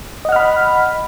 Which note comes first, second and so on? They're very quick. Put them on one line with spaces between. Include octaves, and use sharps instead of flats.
D#5 F#5 F6 B5